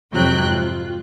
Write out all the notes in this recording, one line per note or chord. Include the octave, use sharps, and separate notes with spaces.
F2 G#2 C3 F#3 G5 F#6
F4